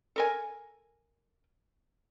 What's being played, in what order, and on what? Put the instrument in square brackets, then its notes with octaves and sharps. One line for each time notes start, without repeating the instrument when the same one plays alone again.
[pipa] A4 A#4 G#5